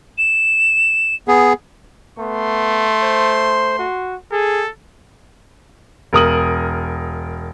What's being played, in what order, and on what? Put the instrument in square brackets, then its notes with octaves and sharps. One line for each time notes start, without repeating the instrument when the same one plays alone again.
[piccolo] E7
[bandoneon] B3 G#4
[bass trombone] A3 [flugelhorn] B3 [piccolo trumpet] C6
[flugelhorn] C5
F#4
[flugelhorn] G#4 [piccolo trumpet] A4
[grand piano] E1 A#4 D#6 F#7